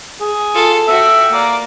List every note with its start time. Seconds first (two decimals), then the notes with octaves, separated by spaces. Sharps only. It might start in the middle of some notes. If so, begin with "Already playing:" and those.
0.21 G#4
0.54 F4 A4
0.88 F#4 E5 G5
1.32 A#3 D5